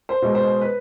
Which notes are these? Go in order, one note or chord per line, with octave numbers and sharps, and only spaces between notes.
C5
B2 G#3
C5
B4